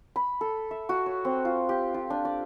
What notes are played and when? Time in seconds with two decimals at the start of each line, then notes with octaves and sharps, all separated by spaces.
0.16 B5
0.41 A4
0.71 E5
0.89 F#4
1.06 C#5
1.25 C4
1.45 F4
1.69 G4
1.94 F4
2.10 D4
2.25 D5